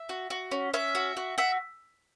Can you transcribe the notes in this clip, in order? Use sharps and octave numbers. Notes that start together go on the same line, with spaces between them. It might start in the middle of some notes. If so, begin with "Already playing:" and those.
Already playing: E5
F#4
F#4
C#4
C#4 E5
F#4
F#4
F#4 E5